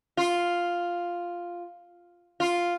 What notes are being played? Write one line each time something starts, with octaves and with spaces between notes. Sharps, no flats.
F4
F4